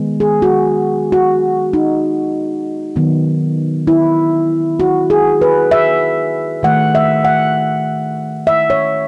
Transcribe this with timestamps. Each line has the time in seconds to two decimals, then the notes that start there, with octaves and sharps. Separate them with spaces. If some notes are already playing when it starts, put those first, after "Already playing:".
Already playing: D#3 G#3 B3
0.20 G#4
0.42 F#4
1.12 F#4
1.73 D#4
2.96 D#3 F#3 B3
3.87 E4
4.80 F#4
5.10 G#4
5.42 B4
5.71 E5
6.63 D#3 A3 F#5
6.95 E5
7.25 F#5
8.47 E5
8.70 C#5